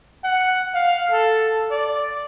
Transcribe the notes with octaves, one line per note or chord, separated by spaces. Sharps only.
F#5
F5
A4
D5